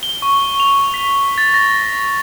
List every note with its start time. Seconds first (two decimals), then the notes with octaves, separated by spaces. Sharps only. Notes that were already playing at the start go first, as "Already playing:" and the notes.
0.03 G7
0.22 C#6
0.60 F7
0.94 B6
1.38 A6
1.54 A#6